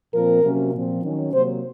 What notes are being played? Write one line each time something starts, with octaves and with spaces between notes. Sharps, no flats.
A#2 F3 C4 A#4
C3 F#3 A#3 C#4
A#2 F3 C4
D#3 F#3 C#4
C3 F#3 A#3 C5